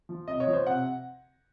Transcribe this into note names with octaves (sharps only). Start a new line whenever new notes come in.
F3
C3 D#5
C#5
F3
C5
C3 F#5